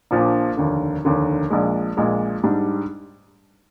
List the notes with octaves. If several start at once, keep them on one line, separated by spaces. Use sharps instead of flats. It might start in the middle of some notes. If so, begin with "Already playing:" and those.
A#1 A#2 F3 A#3 D4
F1 D#2 D3
F1 D#2 D3
A#1 A#2 G#3
A#1 A#2 G#3
G#2 G3 D4